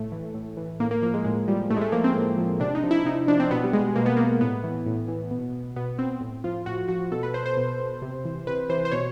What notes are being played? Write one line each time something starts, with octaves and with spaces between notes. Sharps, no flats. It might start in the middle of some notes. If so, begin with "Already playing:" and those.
Already playing: A2 A3
E3
A2
E3
A2 A#3
A#3
F3 A#3
G#3
A2 G#3
F3 G3
A2 A3
G#3
A3
F3 A#3
C4
A2
F3
C3 D4
D#4
F3
E4
E4
C3 D#4
F3 D4
C4
B2 B3
G3
G#3
B2 A#3
B3
A#3
A2 B3
E3
A2
E3
B2
B2 B3
C4
A2
F3 F4
A2 F#4
F3 F#4
B2 A4
B4
C5
C5
B2
C3
E3
C3 B4
E3 C5
C5
B2 C#5